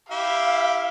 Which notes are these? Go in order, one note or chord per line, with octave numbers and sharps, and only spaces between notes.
E4 G4 E5 F5